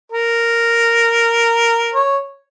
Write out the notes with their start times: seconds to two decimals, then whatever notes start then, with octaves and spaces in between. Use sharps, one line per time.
0.12 A#4
1.93 C#5